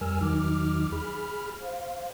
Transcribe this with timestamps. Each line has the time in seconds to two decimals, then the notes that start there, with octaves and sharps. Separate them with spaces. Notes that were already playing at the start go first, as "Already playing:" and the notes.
0.01 F2 G3 A#4 G#5 E6 F6
0.21 E2 D#3 F#3 D#4 D6 F6
0.92 G#4 B5 F6
1.61 C5 F5